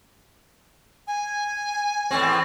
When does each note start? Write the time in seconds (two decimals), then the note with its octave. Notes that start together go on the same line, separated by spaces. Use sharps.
1.07 G#5
2.11 E2 A2 C4